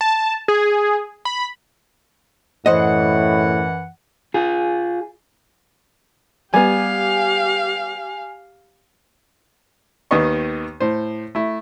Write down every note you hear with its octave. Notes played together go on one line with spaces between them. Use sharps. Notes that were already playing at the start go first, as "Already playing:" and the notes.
A5
G#4
B5
F#2 A2 E3 C5 D#5 F#5
F4 G#4
G3 B3 G4 F5 G#5
D#2 D#3 B3 D#5 C#6
A2 C5
A3 E4